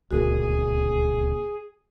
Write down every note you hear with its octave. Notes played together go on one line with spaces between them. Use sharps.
D1 C#2 A#2 F#4 G#4 A#4